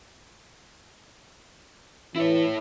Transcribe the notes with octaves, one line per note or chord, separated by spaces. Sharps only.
E3 E4 C#5